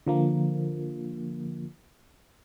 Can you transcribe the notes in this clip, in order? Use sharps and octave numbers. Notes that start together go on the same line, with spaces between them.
D3 F3 A#3